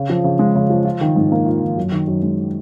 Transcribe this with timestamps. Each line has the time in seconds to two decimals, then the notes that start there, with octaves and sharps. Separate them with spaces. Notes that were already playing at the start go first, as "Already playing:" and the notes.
Already playing: C#3
0.10 F3
0.24 C#3
0.39 G#3
0.55 C#3
0.70 F3
0.85 F4
1.01 D#3
1.16 G#2
1.32 A#3
1.46 F4
1.62 D#3
1.77 F#2
1.92 D#3
2.07 F#2
2.23 G#3